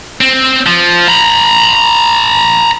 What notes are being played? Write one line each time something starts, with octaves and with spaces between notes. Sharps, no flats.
C4
F3
A#5 B5